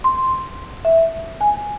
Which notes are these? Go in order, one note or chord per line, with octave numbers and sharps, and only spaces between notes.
C6
E5
G#5